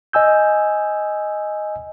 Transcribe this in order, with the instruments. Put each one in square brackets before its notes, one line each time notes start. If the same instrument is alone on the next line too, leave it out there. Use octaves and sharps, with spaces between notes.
[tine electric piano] D#5 G#5 E6 G6